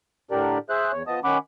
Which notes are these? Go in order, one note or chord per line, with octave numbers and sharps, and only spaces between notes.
A2 D3 D4 G4 A#4 D5
G#4 C5 E5 F#6
E2 C#5
F3 B3 D#5 A5 D#6
D#3 C#4 F#5 B5 D6